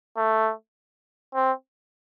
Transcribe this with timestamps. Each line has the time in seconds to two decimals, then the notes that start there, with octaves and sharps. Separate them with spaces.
0.17 A3
1.35 C4